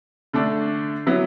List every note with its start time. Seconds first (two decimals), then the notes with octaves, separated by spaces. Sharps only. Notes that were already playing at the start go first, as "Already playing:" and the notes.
0.33 D3 A3 D4
1.07 F#3 B3 E4